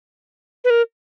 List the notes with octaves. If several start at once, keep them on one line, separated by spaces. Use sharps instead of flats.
B4
A#4